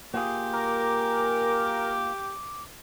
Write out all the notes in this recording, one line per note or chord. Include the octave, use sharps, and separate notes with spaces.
A#3 F4 G4 G#4
A#4 D6